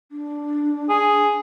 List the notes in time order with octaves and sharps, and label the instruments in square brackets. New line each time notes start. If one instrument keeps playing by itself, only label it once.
[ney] D4
[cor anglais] G#4